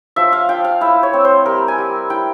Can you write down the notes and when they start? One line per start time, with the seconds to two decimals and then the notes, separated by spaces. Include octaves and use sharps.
0.16 F3 E5
0.33 F5
0.49 F3 G5
0.64 F5
0.81 E4 E5
1.03 C#5
1.13 C4
1.25 C5
1.46 G3 A#4
1.68 G#5
1.78 G3
2.10 E4 G5